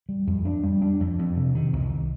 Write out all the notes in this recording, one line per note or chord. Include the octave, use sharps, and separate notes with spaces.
G3
F2
D4
G3
D4
F2
F2
C3
D#3
C2